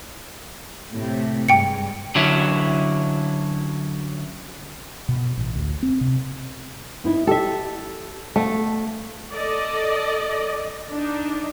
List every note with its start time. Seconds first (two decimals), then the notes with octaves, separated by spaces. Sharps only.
0.93 A2 C3 A3
1.49 G2 G#3 G5 C#7
2.15 D3 F#3 C#4 E4
5.09 B2
5.37 A1
5.56 D2
5.83 C4
6.01 C3
7.04 B3 D#4 E4
7.27 G4 A4 E5
8.36 A3 B3 F5 A5
9.31 A4 D5 D#5
10.92 D4 D#4